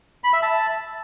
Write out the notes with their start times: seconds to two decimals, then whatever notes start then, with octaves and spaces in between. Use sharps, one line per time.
0.24 B5
0.33 E5
0.43 A5